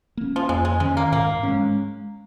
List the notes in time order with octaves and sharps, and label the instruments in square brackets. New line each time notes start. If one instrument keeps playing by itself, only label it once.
[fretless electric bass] A#3 C#4
[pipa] F3
[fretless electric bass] F2 [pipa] G#3
[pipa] G#3
[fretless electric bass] D#3 C#4 [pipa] G#3
[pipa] A#3
[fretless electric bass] G#2 [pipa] A#3
[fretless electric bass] G#3 C#4